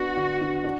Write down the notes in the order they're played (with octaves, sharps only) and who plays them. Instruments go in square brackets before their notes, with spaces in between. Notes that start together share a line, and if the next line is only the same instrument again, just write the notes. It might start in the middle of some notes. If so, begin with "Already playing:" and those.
Already playing: [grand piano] B3 D4 [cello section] F#4
[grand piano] D3
D3
D4